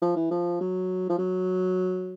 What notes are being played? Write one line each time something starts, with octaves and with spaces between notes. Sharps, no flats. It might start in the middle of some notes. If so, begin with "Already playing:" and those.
F3
E3
F3
F#3
F3
F#3